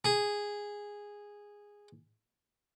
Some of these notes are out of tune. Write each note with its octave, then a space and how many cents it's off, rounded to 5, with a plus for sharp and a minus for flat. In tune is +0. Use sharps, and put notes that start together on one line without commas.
G#4 -10